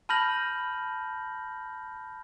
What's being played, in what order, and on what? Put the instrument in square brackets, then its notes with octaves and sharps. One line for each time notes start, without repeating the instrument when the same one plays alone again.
[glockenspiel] A5 B5 F6 G6 A#6 F#7